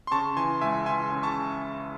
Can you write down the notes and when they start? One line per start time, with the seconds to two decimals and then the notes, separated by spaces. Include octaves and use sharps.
0.07 C6
0.11 C#3 A5 C#6
0.37 E3 G#5 C6
0.61 C#2 E5 G#5
0.86 E3 G#5 C6
1.11 C#3
1.23 A5 C#6